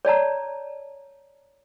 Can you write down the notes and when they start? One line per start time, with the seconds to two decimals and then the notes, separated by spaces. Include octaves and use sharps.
0.05 C#5 D5 A5 A#5